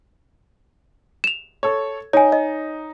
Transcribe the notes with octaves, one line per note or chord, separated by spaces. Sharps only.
E7 F7
A4 C#5
D#4 C#5 G#5
D#5